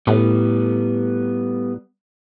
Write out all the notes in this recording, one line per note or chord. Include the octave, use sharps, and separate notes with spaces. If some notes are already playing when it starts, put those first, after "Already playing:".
A2 G3 B3